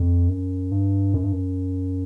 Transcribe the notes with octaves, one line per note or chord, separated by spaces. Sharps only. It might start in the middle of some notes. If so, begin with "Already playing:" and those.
Already playing: F2
F#2
G2
F#2
G2
F#2